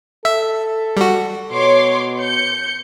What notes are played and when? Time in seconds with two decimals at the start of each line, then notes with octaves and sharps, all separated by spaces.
0.25 A4 E5
0.97 G3 F#4
1.52 B2 C#5 C6 D6
2.20 G6 C#7